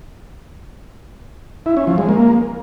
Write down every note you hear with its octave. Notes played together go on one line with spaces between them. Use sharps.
E4
C#4
F3
G#3
A#3